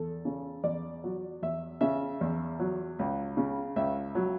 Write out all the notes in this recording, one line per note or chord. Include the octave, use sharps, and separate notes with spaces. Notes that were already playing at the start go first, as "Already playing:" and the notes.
Already playing: E2 A4
C#3
E2 D5
F#3
E2 E5
C#3 E5
E2
F#3
C#2
C#3
C#2 E5
F#3